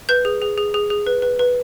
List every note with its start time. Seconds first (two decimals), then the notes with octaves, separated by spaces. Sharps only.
0.09 B4 G6
0.25 G#4
0.42 G#4
0.58 G#4
0.74 G#4
0.90 G#4
1.07 B4
1.22 B4
1.39 B4